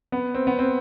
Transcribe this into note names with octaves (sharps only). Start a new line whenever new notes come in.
B3
C4
B3
C4